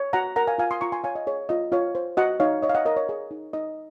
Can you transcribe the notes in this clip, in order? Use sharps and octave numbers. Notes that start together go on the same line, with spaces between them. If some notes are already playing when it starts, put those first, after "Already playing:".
Already playing: C#5
F#4 F#5 A#5
A#4 F#5 A#5
F5 G#5
F4 F5 G#5
C6 D#6
F4 A#5 C#6
G#5 C6
C#5 F5 G#5
D#5
G#4 C#5
F4 D#5
F4 C#5 F5
C5
F#4 D#5 F#5
D#4 C#5 F5
C#5 D#5
F5
D#5 F#5
A#4 D#5
C#5
G#4
D#4
D#4 D#5